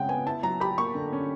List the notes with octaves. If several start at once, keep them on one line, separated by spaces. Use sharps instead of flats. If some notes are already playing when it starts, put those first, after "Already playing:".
Already playing: C#3 G#3 C4 F#5 G5
B3 G#5
E4 A5
F#3 A#5
G4 B5
A#3 C#6
D3
C#4